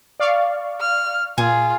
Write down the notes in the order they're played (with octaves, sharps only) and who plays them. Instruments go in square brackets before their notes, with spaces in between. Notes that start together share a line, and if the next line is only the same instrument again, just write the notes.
[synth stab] D5 F5 C#6
[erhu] F6
[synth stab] A#2 [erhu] F4 [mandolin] G#4